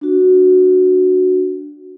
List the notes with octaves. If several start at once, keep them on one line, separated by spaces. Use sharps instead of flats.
D4 F#4